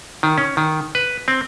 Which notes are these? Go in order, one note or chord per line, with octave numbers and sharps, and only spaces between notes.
D#3
C#4
D#3
B4
C4